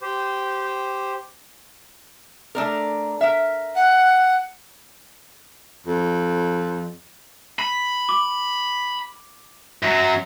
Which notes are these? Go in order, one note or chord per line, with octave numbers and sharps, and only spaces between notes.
G4 C5
A3 D4 A#4
A#4 E5
F#5
F2
B5
D6
F#2 F#3